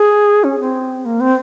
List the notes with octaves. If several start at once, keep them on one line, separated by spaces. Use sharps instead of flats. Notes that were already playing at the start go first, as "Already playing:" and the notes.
Already playing: G#4
C#4
C4
A#3
C4